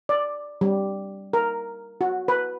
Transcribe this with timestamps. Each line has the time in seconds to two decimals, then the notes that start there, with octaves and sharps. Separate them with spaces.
0.09 D5
0.61 G3
1.33 A#4
2.01 F#4
2.28 B4